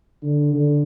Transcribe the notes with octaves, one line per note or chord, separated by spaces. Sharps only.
D3
D3